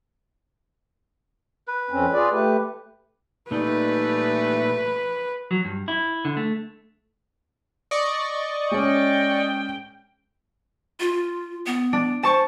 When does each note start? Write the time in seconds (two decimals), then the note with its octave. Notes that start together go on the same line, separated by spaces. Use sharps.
1.67 B4
1.91 F2 C4 C#4
2.13 F4 G#4 D5
2.31 A3 G4 B4
3.51 A#2 E3 G3 A3 D#4 B4 D5
5.51 F#3
5.65 G2
5.88 E4
6.25 D3
6.37 A3
7.91 D5 D#5 C#6
8.71 G#3 C#4 G5
11.00 F4
11.66 B3
11.93 D4
12.23 C5 A5 C#6